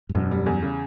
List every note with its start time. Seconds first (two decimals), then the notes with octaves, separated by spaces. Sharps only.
0.09 G2
0.15 E1 F#2
0.31 G3
0.46 E2
0.62 C#3